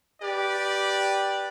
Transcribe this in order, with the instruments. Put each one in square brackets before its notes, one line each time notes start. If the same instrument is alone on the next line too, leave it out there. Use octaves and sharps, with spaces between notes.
[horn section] G4 B4 D5